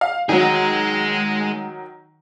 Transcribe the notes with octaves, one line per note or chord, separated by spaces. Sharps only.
F5
D#3 F#3 G#3 G#4